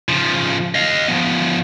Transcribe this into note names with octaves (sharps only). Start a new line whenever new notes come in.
C#3 F3
D#5 F5
F3 B3